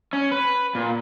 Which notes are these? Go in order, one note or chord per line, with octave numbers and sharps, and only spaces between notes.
C#4
B4
A#2